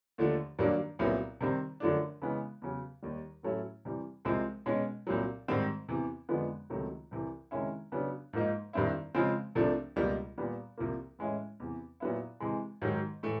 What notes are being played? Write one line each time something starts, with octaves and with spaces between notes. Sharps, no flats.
D#2 D3 F3 A3
G2 D#3 F#3 A#3 D4
C2 A#2 F#3 B3 E4
C3 D#3 G3 C4
F#2 D3 F3 A3 D4
C#3 E3 G#3 B3
E2 C#3 F#3
D#2 D#3 G3
A2 F#3 A3 C#4 E4
C3 E3 G3
C2 C3 F3 G#3 C4
B2 G#3 C#4
C2 A#2 F#3
G#2 D#3 G3 C4
E2 C3 E3
F2 D3 F3 G#3 B3
C#2 C3 D#3 F#3 A3
C2 C3 E3
C3 D#3 G#3 C#4 E4
C#3 F#3 B3 D4
G#2 F3 A#3 D#4
G2 D#3 G3 C4 E4
C#3 F3 G#3 C4
C2 C3 F3 A3 D4
C#2 B2 G3 A#3
A#2 G3 B3
C2 C3 F3 A#3
A2 E3 G#3 C#4 E4
E2 C3 E3
A#2 F#3 B3 E4
C3 E3 G#3
G#2 D#3 F#3
A2 E3 A3